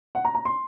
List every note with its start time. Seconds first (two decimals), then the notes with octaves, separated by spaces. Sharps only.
0.15 F#5
0.25 A#5
0.35 A#5
0.45 C6